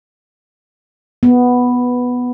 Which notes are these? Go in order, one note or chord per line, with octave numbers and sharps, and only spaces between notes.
B3